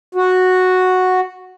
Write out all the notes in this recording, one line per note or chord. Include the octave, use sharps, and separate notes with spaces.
F#4